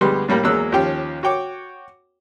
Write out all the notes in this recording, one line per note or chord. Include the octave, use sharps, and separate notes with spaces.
D2 G3 G#3 B3 G4 C6
A2 G3 A#3 B5
E2 F#3 G#3 A#3 E6 F#6
D#2 F3 C#4 G4 G5
F#4 C#5 G5 D6